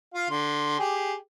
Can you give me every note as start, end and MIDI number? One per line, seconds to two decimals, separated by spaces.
0.14 0.27 65
0.14 0.27 77
0.30 0.77 50
0.30 0.77 84
0.79 1.14 67
0.79 1.14 68